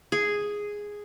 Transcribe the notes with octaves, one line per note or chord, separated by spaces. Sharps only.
G#4